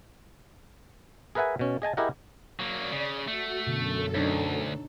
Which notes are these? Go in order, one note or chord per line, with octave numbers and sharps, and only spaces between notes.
G#4 A#4 B4 E5 F#5 G#5
B2 C#4
G#4 D#5 G#5 A5
E4 G4 G#4 A#4 D#5 F#5
F#3 A#3 D5
C#3
A3 F#4
F#2 B2 D3 A4
D2 D4 D#4 C#5